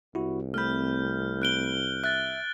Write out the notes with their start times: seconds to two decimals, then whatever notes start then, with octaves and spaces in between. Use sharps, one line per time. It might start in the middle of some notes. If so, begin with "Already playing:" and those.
0.15 C2 E4 F#4
0.54 A3 C4 B5 F6 G6
1.42 F#6 D7 G7
2.04 E5 F#6 A6